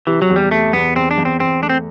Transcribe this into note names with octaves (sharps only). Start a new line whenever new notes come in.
C3 E3
F#3
E2
G3
C3 A3
E2 B3
E2 C4
D4
E2
C4
E2 C4
A3 D4
C4